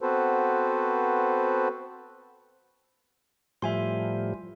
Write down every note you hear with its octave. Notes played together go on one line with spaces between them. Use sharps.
B3 C4 F#4 A4 B4 C5
A2 F3 G3 E5 G#5 C6